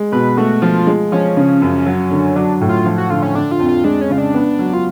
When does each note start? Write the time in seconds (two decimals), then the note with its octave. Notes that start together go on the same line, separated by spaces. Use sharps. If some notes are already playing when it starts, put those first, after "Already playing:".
Already playing: G#3
0.12 B2 B4
0.37 A3 F#4
0.62 F3 F4
0.87 G#3
1.12 F3 C#4
1.37 C#3
1.62 F#2
1.86 F#3
2.11 D3
2.36 F#3 D4
2.61 A2
2.69 F4
2.86 F3
2.98 F#4
3.10 D3 F4
3.22 C#4
3.35 D3 D4
3.51 F4
3.60 F2
3.69 F4
3.84 G#3 D4
4.01 C#4
4.10 C#3 F4
4.18 D4
4.34 B3
4.59 F#3
4.73 F4